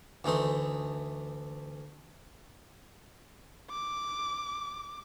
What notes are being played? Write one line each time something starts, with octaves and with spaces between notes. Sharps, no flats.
D2 E3 A3 D#4 C6
D6